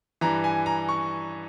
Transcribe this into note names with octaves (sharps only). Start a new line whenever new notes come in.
G2 E3 A#5
G#5
A#5
C#6